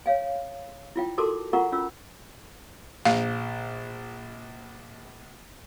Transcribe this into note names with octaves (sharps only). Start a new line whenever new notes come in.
C#5 F5 G#5
E4 F4 G5
F#4 A4 A#4 A5 C6 D6
F4 A#4 F#5 A#5 C#6
C#4 F4 B5 E6
A#1 F5